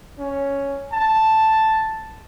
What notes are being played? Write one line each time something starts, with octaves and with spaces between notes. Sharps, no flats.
C#4
A5